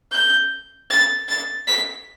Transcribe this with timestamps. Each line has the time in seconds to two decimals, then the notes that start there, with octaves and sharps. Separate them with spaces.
0.12 G6
0.90 A6
1.28 A6
1.67 B6